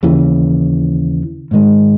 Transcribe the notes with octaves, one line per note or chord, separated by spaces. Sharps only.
D#2 C#3 E3
G#2 D#3 G#3